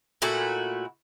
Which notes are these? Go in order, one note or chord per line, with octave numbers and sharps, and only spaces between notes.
A#2 A3 E4 F#4